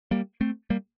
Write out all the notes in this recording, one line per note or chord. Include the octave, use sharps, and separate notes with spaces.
G3 A#3
A3 C4
G3 A#3